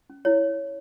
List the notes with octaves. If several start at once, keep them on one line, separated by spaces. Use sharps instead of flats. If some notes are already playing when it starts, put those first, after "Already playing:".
C#4
E4 C#5